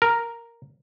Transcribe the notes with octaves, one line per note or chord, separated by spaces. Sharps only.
A#4